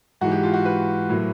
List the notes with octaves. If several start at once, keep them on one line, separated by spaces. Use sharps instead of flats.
G#2 E3 G#3 F#4
G4
F4
F#4
B4
A2 F#3 A#3